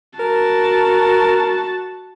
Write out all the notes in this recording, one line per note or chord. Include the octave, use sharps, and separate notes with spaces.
F#4 A#4 A5